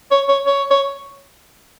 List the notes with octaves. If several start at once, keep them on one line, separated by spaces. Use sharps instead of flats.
C#5
C#5
C#5
C#5